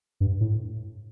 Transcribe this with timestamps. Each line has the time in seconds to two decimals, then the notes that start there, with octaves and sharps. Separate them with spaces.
0.20 G2
0.41 A2